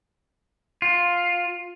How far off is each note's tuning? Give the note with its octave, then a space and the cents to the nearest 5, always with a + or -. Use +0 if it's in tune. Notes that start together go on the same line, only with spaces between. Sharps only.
F4 +10